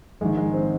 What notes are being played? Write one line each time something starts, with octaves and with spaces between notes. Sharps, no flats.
A#1 G#2 D#3 G#3
G#3
C4